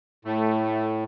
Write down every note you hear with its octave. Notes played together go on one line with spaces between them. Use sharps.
A2 A3